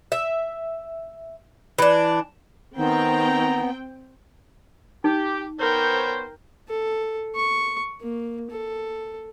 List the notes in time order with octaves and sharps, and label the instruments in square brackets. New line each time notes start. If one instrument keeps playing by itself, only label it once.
[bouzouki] E5
E3 D4
[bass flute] D#3 [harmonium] B3 [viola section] C4 G5 [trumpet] A#5
[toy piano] D#4 [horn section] G4
[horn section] B3 C5 C#5 [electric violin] A#4 G5
[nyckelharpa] A4
C#6
A#3
A4